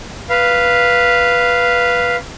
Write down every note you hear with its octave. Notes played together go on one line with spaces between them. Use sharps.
B4 F5